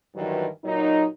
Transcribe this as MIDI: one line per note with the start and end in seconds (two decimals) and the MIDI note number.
0.15 0.46 43
0.15 0.46 51
0.15 0.46 52
0.15 0.46 54
0.64 1.05 46
0.64 1.05 54
0.64 1.05 63